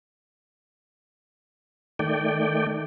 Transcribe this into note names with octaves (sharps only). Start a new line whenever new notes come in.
D#3 A3 D5 G5